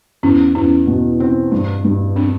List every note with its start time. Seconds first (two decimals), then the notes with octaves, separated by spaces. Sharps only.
0.23 E2 C#4
0.55 E2 C#4
0.87 B2
1.20 C4
1.52 G2
1.84 G2
2.16 C4 D4